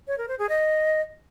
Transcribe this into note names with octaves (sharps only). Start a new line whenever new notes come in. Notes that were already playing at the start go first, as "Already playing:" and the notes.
C#5
A#4
C5
G#4
D#5